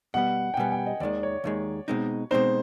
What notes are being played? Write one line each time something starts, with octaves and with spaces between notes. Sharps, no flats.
B2 G3 B3 F#5
G5
B2 G3 B3 G#5
G5
D#5
D#2 D#3 G#3 D5
C#5
D#2 D#3 G#3
B2 G#3 C4 D#4
B2 G#3 C4 D#4 C5